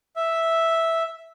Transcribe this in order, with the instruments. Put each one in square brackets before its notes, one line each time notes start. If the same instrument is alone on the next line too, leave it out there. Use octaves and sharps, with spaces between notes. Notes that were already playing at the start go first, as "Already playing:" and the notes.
[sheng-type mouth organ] E5